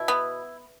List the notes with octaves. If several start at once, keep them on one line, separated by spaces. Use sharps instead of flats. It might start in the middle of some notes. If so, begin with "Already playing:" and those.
Already playing: B2 E4
B3